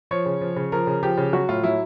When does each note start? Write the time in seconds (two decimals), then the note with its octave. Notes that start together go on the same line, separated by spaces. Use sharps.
0.11 F3 C#5
0.26 C#3
0.41 F3
0.56 C#3
0.72 F3 A#4
0.87 C#3
1.03 F3 G4
1.18 C#3
1.33 F#3 F#4
1.49 A2 F4
1.63 F#3 E4